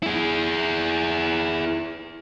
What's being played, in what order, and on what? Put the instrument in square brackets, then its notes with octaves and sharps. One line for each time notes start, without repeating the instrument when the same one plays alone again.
[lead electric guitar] E4 G#4